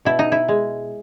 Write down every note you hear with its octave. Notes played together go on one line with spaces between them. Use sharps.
B2 E4
D#4
E4
G#3